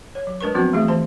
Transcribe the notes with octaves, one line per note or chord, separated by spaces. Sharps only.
C#5
F#3
G#3 D4 A#4 B4 C#6
F3 F#3 B3 C4 D4 F#4
E3 A3 D#4 G#4 E5
E3 C5 A5